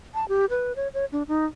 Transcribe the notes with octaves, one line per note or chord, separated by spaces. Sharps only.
A5
G4
B4
C#5
C#5
D4
D#4